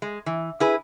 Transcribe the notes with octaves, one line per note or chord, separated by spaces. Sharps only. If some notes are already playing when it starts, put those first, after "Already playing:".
G#3
E3
E4 G#4 B4